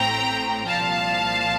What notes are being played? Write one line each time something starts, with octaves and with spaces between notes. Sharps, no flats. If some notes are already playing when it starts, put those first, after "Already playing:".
Already playing: A1 A2 A3 C4 G5 A#5
C2 A#2 F3 F5 A5